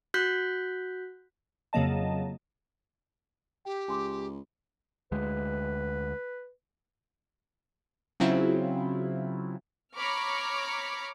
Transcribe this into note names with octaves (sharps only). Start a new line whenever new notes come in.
F#4 F#6 G6 B6
F2 C#3 F#3 A#3 D#5 A5
G4 G5
C#2 G#5 C6 D6
D2 G#3 B4
C#3 F#3 C4 E4 F4
C#5 A#5 B5 C#6 D6 F6